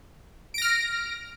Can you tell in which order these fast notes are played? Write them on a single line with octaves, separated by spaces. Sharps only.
D7 A#6 F6